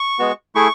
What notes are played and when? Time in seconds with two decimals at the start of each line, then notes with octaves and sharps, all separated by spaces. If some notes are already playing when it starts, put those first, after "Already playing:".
Already playing: C#6
0.19 G#3 B3 F#4
0.55 A3 E4 G#4 C#6